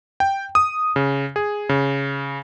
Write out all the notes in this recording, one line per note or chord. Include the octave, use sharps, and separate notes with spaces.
G5
D#6
C#3
G#4
C#3